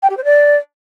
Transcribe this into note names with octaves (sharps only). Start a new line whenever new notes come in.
G5
G4
C5
D5